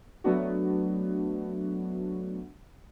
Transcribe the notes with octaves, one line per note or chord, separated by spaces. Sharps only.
F#3 A3 B3 D4 F#4